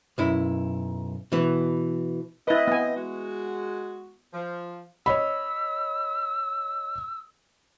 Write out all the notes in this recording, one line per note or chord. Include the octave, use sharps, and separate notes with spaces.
B1 F#2 E4
B2 E3
C4 E4 B4 D#5
B3 G#5
G#3 F#4
F3
C#5 D#5 B5 E6